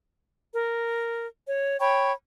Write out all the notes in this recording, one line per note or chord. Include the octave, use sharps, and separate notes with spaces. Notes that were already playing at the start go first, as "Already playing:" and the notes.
A#4
C#5
C#5 G5 B5 C#6